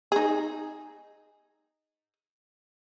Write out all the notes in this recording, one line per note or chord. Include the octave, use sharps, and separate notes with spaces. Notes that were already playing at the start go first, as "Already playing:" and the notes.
D#4 G#4